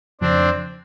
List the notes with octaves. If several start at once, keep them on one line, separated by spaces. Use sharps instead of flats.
F2 C#3 F3 C4 D4